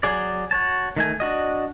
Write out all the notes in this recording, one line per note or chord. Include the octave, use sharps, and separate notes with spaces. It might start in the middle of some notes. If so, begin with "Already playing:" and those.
F#3 G#4 D5
F#4 C#5 A5
D#3 A3 G#5
D4 F#4 D#5